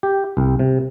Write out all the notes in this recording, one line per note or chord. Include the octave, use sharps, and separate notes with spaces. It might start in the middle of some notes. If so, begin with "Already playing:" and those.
G4
C2
C3